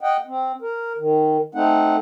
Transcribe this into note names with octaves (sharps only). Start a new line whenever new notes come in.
D#5 F#5 G5
C4
A#4
D#3
A3 C4 D#4 F#5